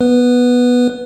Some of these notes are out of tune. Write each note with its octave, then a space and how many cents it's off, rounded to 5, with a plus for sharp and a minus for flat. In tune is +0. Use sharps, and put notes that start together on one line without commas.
B3 -10 B4 +0